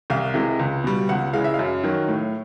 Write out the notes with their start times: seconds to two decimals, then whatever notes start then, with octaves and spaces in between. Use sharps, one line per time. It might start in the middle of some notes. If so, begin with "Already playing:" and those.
0.10 C2 F5
0.34 C3 E3 G#3
0.59 C#2
0.84 B2 G3
1.09 C#2 F#5
1.33 C#3 E3 G#3 F5
1.44 E5
1.54 F5
1.59 F#2
1.83 D#3 F#3
2.08 A2